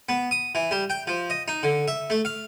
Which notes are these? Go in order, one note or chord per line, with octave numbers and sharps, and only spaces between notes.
B3
D#6
E3
G3
G5
F3
D#5
D#4
D3
E5
A3
F5